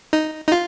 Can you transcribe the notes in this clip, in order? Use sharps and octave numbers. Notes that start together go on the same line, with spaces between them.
D#4
D#4
F4